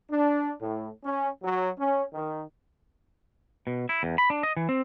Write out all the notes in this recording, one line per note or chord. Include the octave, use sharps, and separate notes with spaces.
D4
A2
C#4
F#3
C#4
D#3
B2
E4
E2
B5
D4
D#5
E3
C4